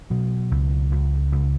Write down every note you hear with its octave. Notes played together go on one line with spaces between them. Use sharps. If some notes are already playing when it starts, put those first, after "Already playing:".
B2 F#3
C#2
C#2
C#2